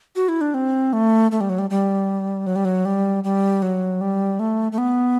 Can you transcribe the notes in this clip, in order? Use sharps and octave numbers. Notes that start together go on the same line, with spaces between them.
F#4
E4
D4
C4
A3
A3
G3
F#3
G3
G3
F#3
G3
F#3
G3
G3
F#3
G3
A3
A3
B3